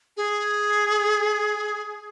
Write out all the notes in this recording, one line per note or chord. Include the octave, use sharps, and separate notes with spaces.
G#4